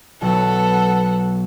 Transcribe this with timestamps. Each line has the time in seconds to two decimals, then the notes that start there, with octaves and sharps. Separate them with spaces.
0.22 B1 B3 A4 F#5